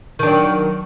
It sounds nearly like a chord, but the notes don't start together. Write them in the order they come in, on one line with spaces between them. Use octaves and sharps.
D#3 D4 F#3